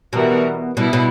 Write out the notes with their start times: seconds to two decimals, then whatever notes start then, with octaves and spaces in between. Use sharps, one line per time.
0.13 B2 E3 G3 B3 F#4 A#4
0.77 B2 G3 B3 E4
0.93 B2